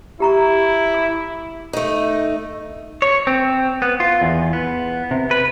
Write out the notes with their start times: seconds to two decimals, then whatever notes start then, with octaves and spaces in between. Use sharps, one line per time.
0.20 E4 G4 A#5 C#6
0.94 D6
1.73 A3 D#4
3.02 C#5
3.27 C4
3.82 B3
4.00 F4
4.22 E2
4.53 B3
5.11 C3
5.31 B4